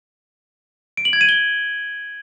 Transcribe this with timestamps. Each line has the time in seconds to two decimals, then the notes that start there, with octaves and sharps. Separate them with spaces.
0.97 D7
1.05 F#7
1.13 G#6
1.21 D#7
1.29 G7